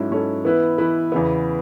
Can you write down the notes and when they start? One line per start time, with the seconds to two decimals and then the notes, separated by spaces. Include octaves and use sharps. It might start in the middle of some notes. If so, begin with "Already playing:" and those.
Already playing: G#2 F#3 C#4 E4 A4
0.11 G#2 F#3 C#4 E4 A4
0.44 E3 B3 E4 B4
0.78 E3 B3 E4 B4
1.12 E2 C#3 E3 B3